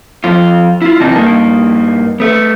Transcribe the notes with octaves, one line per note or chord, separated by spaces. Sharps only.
F2 F4
E4 F4
F#2 C3 E3 D#4 A5
G2 A#3 D#4
A3 B3